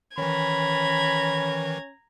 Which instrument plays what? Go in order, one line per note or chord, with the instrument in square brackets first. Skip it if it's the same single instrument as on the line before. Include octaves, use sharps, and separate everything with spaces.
[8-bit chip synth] D#3 E3 [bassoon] C#4 [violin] A#5 G#6 [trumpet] B5